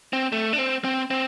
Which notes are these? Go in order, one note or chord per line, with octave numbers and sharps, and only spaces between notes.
C4
A3
D4
C4
C4
C4